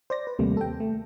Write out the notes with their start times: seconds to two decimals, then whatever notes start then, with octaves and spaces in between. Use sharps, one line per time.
0.10 C5 D5 A#6
0.27 B4
0.39 D#2 C3 G3 A3 A#3
0.57 A4 G5
0.80 A3